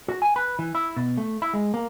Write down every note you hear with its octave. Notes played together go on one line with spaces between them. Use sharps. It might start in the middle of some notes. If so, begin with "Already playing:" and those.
F#4
G#5
B4
E3
E4
B2
A3
E4
G#3
A#3